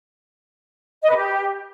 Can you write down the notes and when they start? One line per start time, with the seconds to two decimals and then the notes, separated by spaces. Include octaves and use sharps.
1.02 D#5
1.09 B4
1.16 G4